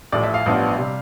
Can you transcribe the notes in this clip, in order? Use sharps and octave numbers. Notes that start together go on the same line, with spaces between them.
A1 A2 F3 D5
E5
F5
A1 G2 F3 B3 D4
C3 G3